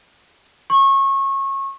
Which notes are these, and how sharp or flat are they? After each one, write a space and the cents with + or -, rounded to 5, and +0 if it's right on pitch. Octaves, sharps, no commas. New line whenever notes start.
C#6 -25